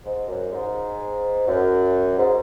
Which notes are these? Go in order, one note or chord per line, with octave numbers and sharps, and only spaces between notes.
G#2
F#2
G#2
F#2
G#2